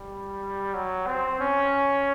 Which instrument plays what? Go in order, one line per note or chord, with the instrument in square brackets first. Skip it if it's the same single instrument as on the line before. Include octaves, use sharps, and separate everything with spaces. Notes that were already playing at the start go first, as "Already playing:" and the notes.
Already playing: [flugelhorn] G3
F#3
C4
C#4